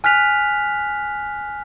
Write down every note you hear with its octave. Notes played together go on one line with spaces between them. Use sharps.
G#5 F6 F#6 B6 F7